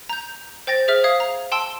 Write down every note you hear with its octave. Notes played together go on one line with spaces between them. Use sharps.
A#5 G6
C5 G5 A6 A#6
G#4 C5 E5 F6
F5 D#6 G#6
A#5
G5 A5 C6 E6